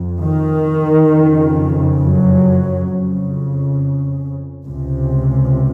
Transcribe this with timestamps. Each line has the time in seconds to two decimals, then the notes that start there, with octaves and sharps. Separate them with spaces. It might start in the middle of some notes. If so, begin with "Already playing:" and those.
Already playing: F2
0.21 D#3
1.10 F2 C#3
1.99 F#2 F#3
2.88 F2 C#3
4.66 C#2 C3